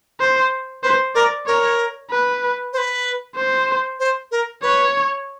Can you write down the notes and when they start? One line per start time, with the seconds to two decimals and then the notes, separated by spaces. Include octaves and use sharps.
0.20 C5
0.83 B4 C5
1.15 A#4 D5
1.47 A#4 C#5
2.10 B4
2.73 C5
2.78 B4
3.36 C5
4.00 C5
4.31 A#4
4.63 B4 C#5